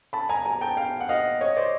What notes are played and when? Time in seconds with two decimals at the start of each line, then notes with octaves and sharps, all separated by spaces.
0.13 A5 B5
0.29 G#5 A#5
0.45 G#5 A#5
0.61 G5 A5
0.77 F5 G5
1.00 F#5
1.09 D#5 F5
1.41 C#5 D#5
1.56 C5 D5